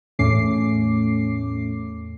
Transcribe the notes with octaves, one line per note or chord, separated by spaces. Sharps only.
E2 A2 A3 C#4 D6 C7